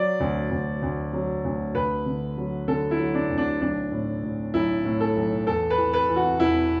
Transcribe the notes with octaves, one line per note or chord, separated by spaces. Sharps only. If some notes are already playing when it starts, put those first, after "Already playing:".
Already playing: F#3 D5
D2
D2
D2
F#3
D2
D2 B4
D3
F#3
D3 A4
E4
F#3
D4
D2
D4
B1 D4
A2
A2
B1 E4
A2
A4
B1
E2 A4
B4
E3
B4
E3
F#4
E1 E4